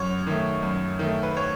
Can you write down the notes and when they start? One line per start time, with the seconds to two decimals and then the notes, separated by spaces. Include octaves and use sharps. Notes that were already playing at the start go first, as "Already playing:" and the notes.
Already playing: F#2 C#5
0.27 D#3 A3
0.63 F#2
0.99 D#3 A3
1.23 B4
1.37 C#5